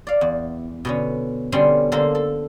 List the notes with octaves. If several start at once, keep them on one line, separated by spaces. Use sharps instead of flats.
D5 F5
E2
B2 D3 C#4
B2 D3 G3 C#4 D4 C6
D3 A#3 A4 A#4 C5
A4